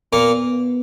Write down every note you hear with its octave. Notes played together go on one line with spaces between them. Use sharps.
A#2 A#3 B3